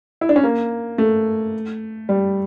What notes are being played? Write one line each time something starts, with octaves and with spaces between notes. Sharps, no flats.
E4
D4
C#4
A#3
A3
G3